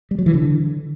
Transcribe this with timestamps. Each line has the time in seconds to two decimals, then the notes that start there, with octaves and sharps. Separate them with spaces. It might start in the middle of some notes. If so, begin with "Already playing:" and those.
0.11 G3
0.19 F#3
0.26 E3
0.34 D3